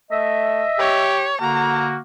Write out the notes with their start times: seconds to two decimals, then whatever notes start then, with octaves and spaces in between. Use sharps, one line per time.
0.11 A3 D#5 E5
0.79 G4 C#5
1.41 D3 A#3 F#4 A#5